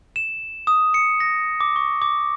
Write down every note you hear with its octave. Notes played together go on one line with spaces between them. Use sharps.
E7
D#6
C#7
A#6
D6
C#6
D6